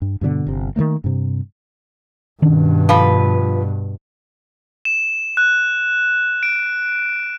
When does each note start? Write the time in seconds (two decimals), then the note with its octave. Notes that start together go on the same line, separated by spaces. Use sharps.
0.02 G2
0.21 G2 B2 D3 B3
0.47 G1 C3
0.76 D#3 F3 A3 A#3
1.04 G2 C3
2.42 G2 B2 D#3 C#4 D4
2.89 F3 B4
4.85 E7
5.37 F#6
6.43 D7